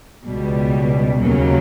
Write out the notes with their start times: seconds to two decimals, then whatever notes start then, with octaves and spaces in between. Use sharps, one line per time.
0.25 C#2 B2 G3
1.18 D#2 C#3 F#3 A#3